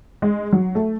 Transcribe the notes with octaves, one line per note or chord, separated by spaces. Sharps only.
G#3
F#3
A3